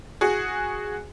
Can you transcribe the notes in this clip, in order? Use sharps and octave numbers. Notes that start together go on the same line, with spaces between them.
F#4 G#4